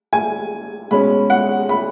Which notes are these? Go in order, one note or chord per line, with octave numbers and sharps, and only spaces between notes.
G#5
B2 G#3 C#4 B5
F#5
B5